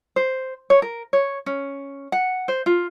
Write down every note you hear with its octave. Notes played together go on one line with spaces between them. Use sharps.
C5
C#5
A#4
C#5
C#4
F#5
C5
F4